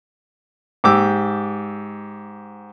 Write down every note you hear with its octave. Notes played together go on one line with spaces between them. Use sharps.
G#2 G4 D6 E6